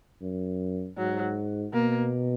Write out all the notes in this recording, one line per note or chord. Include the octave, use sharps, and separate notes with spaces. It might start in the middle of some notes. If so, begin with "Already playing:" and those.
F#2
G#2 F#3
B2 A#3